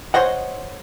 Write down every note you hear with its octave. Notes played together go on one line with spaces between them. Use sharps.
C5 C#5 D#5 F#5